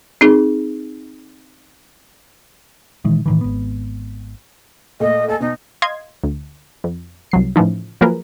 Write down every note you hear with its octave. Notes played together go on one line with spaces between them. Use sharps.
C4 D#4 G#4
A#2 D#3 E3 G#3
A2 D#3 E3
G#1 B3
A#2 A3 D#5
A4 D#5 G#5
B2 D#4
D#5 F5 C6 G#6
D2
F2
C2 F#3 C7
A2 C#3 E3 F3 D#4
F3 F#3 A#3 G#4 A#4 B4